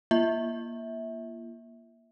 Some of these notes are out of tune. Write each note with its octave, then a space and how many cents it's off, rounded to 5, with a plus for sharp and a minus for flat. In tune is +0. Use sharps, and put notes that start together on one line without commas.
A#3 +20 F4 -40 E5 -20